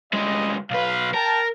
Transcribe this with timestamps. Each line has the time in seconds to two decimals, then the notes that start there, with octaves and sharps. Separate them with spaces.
0.13 D2 G3 G#3 D#5
0.71 B1 B4 F5
1.15 A#4 G5 A5